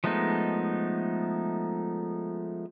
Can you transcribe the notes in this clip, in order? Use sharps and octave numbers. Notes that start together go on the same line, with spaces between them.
F3 G#3 A3 B3 D#4